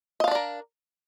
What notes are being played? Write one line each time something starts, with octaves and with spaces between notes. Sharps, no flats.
D4 A#4 D5 D#5 F5